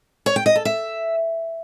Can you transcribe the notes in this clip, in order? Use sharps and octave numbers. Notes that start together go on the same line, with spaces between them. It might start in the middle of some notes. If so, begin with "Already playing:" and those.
C#5
G5
D#5
A4
E5